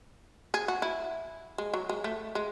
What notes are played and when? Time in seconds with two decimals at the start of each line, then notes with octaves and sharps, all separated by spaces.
0.54 G#4
0.68 F#4
0.82 E4
1.58 G#3
1.74 F#3
1.89 G#3
2.04 A3
2.35 G#3